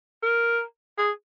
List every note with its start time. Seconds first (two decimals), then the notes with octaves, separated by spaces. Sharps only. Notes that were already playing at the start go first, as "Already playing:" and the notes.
0.23 A#4
0.97 G#4